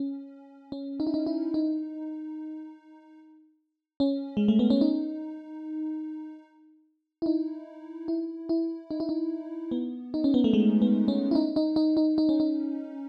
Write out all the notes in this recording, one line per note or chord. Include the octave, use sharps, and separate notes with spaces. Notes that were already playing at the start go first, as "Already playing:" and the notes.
Already playing: C#4
C#4
D#4
E4
D#4
E4
D#4
C#4
G#3
A3
B3
C#4
D#4
E4
D#4
E4
E4
D#4
E4
D#4
B3
D#4
C#4
B3
A3
G#3
B3
C#4
E4
D#4
D#4
D#4
D#4
D#4
C#4
D#4